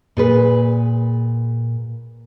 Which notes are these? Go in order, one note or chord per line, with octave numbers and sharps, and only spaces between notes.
A#2 G#4 B4